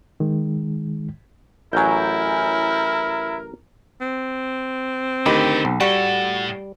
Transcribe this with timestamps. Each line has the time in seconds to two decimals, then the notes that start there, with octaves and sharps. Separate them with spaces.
0.20 D#3 G#3
1.73 A1 F#3 E4 A#4 G#5 G6
4.01 C4
5.26 D2 D#3 G4 A4 D#5 B5
5.65 B1
5.80 A2 G3 F#4 A4 F#5